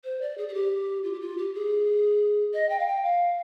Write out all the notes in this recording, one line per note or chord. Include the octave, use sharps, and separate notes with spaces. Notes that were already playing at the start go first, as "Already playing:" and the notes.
C5
D5
G#4
G#4
G4
F4
G4
F4
G4
G#4
D#5
G5
F5
G5
F5